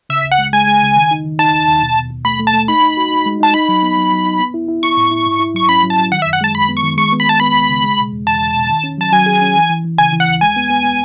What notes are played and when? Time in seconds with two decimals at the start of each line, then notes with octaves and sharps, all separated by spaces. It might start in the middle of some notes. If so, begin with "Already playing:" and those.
0.10 C#3 E5
0.25 C#2
0.31 F#5
0.38 G#3
0.53 G#3 G#5
0.67 G#3
0.82 C#3
0.96 D#3
1.11 D#4
1.25 D#3
1.39 D#4 A5
1.53 D#2
1.68 D#2
1.83 B2
1.97 B2
2.10 B2
2.25 A3 B5
2.40 A3
2.47 A5
2.54 A3
2.68 D#4 B5
2.82 D#4
2.97 F#4
3.11 D#4
3.26 G#3
3.40 D#4 A5
3.54 D#4 B5
3.69 F#3
3.83 B3
3.97 F#3
4.12 F#3
4.26 D#4
4.39 B3
4.54 E4
4.68 E4
4.83 E4 C#6
4.97 A2
5.11 E4
5.26 G#2
5.40 E4
5.54 F#3 C#6
5.69 C#4 B5
5.83 F#3
5.90 A5
5.98 F#3
6.12 D#3 F#5
6.22 E5
6.26 F#2
6.33 F#5
6.41 G#3 A5
6.55 F#2 B5
6.69 B3
6.77 C#6
6.83 D#3
6.97 G#3 C#6
7.13 B3
7.20 B5
7.27 B3 A5
7.40 B3 B5
7.55 C#2
7.69 C#3
7.83 G#3
7.98 B2
8.12 E2
8.27 E2 A5
8.41 E2
8.55 B2
8.69 D#3
8.84 C#4
8.98 F#3 A5
9.12 F#3 G#5
9.26 G#4
9.42 C#4
9.56 E3
9.70 E3
9.84 E3
9.98 C#3 G#5
10.13 E3
10.20 F#5
10.27 D#2
10.41 G#3 G#5
10.56 B3
10.70 B3
10.84 B3